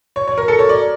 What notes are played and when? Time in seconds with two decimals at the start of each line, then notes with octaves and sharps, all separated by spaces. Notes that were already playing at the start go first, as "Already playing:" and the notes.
0.16 C#5
0.28 C#5
0.38 A#4
0.48 A4
0.59 C#5
0.69 D5